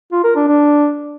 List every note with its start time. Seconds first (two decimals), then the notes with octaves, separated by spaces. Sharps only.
0.12 F4
0.24 A#4
0.36 D4
0.48 D4